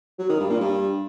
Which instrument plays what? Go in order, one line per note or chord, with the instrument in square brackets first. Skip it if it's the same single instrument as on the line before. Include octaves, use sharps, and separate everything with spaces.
[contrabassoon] F#3
D#3
G2
A#2
G2